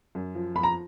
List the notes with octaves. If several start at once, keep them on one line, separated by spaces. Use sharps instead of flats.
F#2
F3
F2 B5
A#5